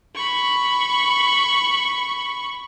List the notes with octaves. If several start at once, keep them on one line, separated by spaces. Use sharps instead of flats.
B5 C#6